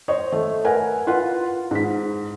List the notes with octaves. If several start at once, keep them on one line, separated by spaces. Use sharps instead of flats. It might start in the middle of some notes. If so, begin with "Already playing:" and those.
C5 C#5 D#5
A3
A#4 B4 F#5 G#5
F4 B4 F#5
G#2 B6